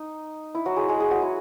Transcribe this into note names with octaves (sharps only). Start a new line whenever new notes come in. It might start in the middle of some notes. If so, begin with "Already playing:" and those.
Already playing: D#4
E4
F#3 F#4
G#3 G#4
G#3 G#4
G#3 G#4
F#3 F#4
E4